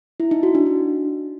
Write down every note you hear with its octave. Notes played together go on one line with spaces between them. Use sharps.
E4
D#4
F#4
D4
D#4